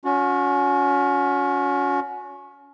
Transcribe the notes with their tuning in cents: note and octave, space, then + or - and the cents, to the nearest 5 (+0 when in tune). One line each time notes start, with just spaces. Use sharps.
C#4 +25 F#4 -30